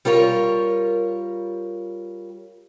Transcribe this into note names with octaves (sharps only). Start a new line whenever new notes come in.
G3 F4 A#4 C#5